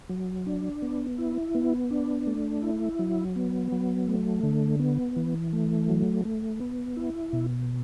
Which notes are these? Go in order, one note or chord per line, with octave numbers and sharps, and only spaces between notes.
F#3
D4
B3
E4
B3
D4
A3
E4
F#3
B3
F#3
A3
D3
B3
E3
A3
F#3
A3
B3
E4
B2